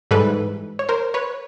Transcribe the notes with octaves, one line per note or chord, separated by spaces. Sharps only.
G#2 E3 G3 A4 B4
C#5
A#4 C5
B4 C#5